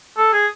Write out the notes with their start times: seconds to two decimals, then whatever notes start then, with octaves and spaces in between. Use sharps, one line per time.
0.17 A4
0.33 G#4